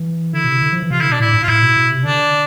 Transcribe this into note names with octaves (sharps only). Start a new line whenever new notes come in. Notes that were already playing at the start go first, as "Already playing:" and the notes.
Already playing: E3
D3 E4
B2
C3
D3
F3
E3
C3 F4
D3 E4
B2 D4
A2 E4
G#2
F4
A2 E4
B2
B2
C3
D3 D4